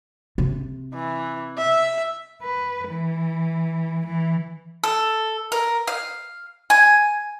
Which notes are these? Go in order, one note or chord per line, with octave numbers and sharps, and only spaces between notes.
C3
E3
E5
B4
E3
E3
A4
A#4
F5
G#5